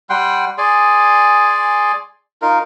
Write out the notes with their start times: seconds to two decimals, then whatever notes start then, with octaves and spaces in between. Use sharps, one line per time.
0.10 G3 F#5 G5 C6
0.58 G#4 D5 G#5 C6
2.42 D#4 F4 A#4